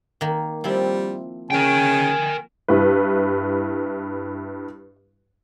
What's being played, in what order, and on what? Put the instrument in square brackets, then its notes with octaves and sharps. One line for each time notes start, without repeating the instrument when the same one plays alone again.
[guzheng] D#3 A#3
[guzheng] F3 C4 E4 [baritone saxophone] G3
[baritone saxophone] C#3 [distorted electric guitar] A#4 G5 [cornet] G#5
[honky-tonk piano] G2 E4 B4